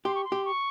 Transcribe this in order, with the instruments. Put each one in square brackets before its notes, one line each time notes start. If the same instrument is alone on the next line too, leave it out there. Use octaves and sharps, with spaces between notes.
[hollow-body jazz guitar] G4 [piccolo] C6
[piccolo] C#6
C6
[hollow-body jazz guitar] G4
[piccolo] C#6